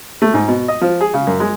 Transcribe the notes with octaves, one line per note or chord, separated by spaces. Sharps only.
A3
G#2
B2
D#5
F3
G#4
C#3
F#2
G#3